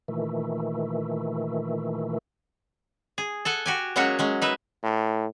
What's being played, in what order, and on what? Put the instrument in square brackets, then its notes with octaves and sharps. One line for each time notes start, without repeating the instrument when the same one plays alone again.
[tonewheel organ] A#2 D#3 E3 A3
[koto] G#4
A4 F#5 G#5
F#4 G4 G#5
F#3 G#3 A#3 C#4 F#4 C#5
F#3 G#3 C#4
D#4 B4 E5
[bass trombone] A2